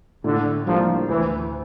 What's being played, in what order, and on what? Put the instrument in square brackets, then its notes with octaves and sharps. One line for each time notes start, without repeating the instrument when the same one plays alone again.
[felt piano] A2 [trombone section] D3
[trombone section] F3 [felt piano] G3 A#3 D4
[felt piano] D2 [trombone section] E3